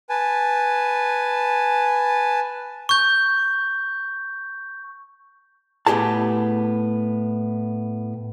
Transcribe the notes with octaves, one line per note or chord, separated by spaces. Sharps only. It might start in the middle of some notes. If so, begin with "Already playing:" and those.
B4 G#5 A5
C#6 G6
A2 B3 G4 G#4 A5